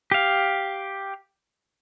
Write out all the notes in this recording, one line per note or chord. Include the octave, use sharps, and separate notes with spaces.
G4 F5